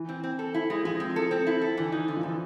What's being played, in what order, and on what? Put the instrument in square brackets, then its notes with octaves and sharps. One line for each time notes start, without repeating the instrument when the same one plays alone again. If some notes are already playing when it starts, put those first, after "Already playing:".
Already playing: [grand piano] E3
[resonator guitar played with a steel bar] C4
C4
A4
E4
G#3
[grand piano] F3 [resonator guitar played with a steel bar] G#3
[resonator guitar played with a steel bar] C4
A4
C4
E4
A4
[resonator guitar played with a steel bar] D3 [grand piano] E3
[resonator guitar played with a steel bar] D#4
D3
[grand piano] F3
[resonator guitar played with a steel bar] D3 [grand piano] E3